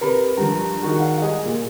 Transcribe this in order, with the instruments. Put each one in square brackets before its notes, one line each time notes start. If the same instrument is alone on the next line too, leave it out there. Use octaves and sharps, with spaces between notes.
[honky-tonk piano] C3 A#5 B5 [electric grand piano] A#4 [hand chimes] B4
[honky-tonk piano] G2 F3 [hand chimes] A#5
[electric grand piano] D#3 F#4 G#4
[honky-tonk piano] F5 F#5
[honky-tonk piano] G3 G#3 G#4 [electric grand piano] D#5
[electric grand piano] A#2